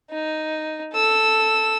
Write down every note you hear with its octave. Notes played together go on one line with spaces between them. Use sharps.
D#4
A4 E6